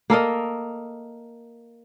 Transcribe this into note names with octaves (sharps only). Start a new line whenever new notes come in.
A#3 A4 A#4 D#5